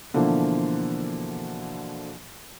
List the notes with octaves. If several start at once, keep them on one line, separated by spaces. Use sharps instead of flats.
B2 D3 E3 F3 A#3